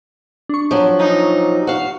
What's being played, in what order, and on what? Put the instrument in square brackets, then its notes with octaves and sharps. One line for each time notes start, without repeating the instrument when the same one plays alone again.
[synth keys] D4 C#6
[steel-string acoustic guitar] F3 F#3
[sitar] A#2 D#4
[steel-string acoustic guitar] F#4 F5